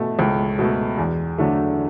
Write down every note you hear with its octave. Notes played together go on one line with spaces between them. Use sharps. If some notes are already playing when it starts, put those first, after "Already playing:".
Already playing: B2 A3
C#2
B2 A3
E2
D3 F#3 A3